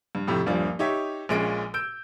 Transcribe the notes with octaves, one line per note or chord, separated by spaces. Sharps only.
G2
F2 A2 C3
D#1 G2 F3 D5
D#4 G4 C#5 E5
A#1 A#2 G#3 C#4 D7
E6 G6 D7